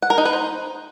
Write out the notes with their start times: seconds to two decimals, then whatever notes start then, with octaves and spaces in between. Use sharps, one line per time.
0.02 F#5
0.10 A#4
0.18 D#4
0.25 B4
0.33 C5